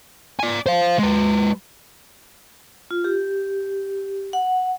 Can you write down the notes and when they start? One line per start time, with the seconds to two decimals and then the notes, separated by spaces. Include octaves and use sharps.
0.39 D5 G#5
0.66 C5 F5
0.99 G#3 B4
2.91 F4
3.04 G4
4.33 F#5